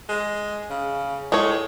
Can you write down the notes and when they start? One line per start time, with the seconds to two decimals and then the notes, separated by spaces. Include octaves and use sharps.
0.09 G#3
0.70 C#3
1.32 A2 G#3 C#5